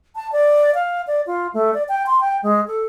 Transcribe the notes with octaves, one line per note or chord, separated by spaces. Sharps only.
A5
D5
F5
D5
F4
A3
D5
G5
C6
G5
G#3
A4